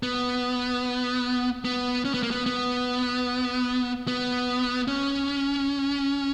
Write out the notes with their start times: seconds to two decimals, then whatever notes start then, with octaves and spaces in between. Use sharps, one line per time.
0.03 B3
1.65 B3
2.05 C#4
2.14 B3
2.23 A#3
2.31 B3
2.46 B3
4.08 B3
4.88 C#4